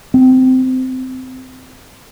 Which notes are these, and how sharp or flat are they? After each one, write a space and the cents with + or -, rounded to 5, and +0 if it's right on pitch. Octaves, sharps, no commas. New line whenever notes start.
C4 -20